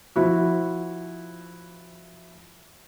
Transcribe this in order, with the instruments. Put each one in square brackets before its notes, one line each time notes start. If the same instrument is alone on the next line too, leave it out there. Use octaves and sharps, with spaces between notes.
[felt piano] F3 E4 F#4